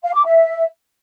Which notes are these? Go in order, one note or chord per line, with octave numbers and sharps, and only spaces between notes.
F5
D6
E5